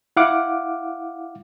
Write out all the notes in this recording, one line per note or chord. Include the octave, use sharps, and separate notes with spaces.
E4 F5 F#5 D6